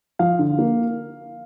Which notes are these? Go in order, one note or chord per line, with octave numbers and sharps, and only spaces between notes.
F3 F5
D3
A#3